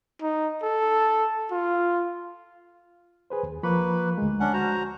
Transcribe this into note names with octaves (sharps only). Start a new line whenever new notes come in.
D#4
A4
F4
G#4 B4 C5
D#2
F3 A#3 B4 B5 C#6
D2 G#3
C#4 D4 F#5
F#4 C5 A#5